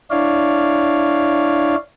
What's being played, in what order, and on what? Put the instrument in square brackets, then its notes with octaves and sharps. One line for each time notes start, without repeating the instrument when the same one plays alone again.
[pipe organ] D4 E4 C#5 D5 F5